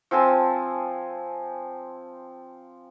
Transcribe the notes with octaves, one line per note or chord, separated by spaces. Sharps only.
F3 C4 G#5 A5